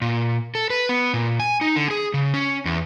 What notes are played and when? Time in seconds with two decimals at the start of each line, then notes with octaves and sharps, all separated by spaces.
0.01 A#2
0.55 A4
0.70 B4
0.89 B3
1.14 A#2
1.40 G#5
1.61 D#4
1.76 D3
1.91 G#4
2.14 C#3
2.34 C#4
2.65 E2